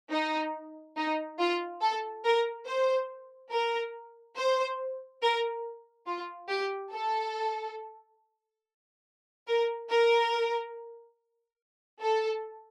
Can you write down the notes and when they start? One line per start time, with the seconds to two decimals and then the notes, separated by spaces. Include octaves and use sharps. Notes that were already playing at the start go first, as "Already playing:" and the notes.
0.12 D#4
0.97 D#4
1.39 F4
1.81 A4
2.25 A#4
2.66 C5
3.51 A#4
4.37 C5
5.22 A#4
6.07 F4
6.50 G4
6.92 A4
9.48 A#4
9.90 A#4
12.02 A4